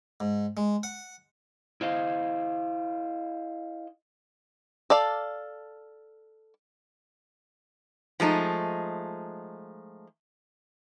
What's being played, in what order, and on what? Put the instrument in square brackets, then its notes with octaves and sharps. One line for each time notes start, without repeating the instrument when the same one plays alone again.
[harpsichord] G#2
G#3
F#5
[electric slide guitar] E4 C5 D#5 F5
[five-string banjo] A4 D5 F5
[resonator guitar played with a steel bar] F3 G#3 A3 D#4